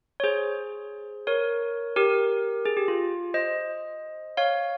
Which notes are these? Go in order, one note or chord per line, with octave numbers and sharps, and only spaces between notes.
C#5
G#4 C5
A#4 C#5
G4 A#4
G#4
G4
F4
C5 D#5
C#5 F5